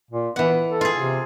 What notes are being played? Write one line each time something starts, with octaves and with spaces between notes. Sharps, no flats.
A#2
E3 B3 F#5
A4
F4 G#4
C3